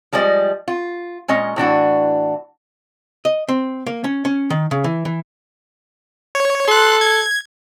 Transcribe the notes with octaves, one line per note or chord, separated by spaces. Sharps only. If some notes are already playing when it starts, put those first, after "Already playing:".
F3 G3 G#3 D5 D#5
F4
A#2 G#3 C#4 D#5
A2 E3 D4 F#4
D#5
C4
A#3
C#4
C#4
D#3
C#3
E3
E3
C#5
A4 C6 F#6
G#6